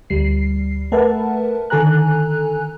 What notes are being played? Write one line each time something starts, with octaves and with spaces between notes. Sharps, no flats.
D2 G3 C7
A3 A#4 B4 E5 F#5 A5
D3 D#3 A4 G#5 A#5 F#6